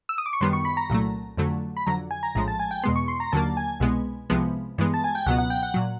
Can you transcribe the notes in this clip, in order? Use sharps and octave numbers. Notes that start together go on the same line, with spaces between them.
E6
D#6
D6
C#6
F#2 D#3 G3 B3 C6
C#6
B5
A#5
C2 A#2 F#3 A3
F2 D3 F#3 A3
B5
F2 D3 F#3 A#5
G#5
A#5
A#1 A2 F3 G#3 A#5
A5
G#5
G5
E2 B2 G#3 B3 C6
C#6
C6
A#5
D#2 D3 F#3 A#3 A5
G#5
C2 B2 G#3 B3
C2 C3 F3 G#3 B3
G2 E3 G#3 B3
A5
G#5
G5
C#2 B2 F#3 B3 F#5
F#5
G5
F#5
A#2 F#3